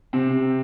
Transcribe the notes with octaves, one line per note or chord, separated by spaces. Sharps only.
C3 C4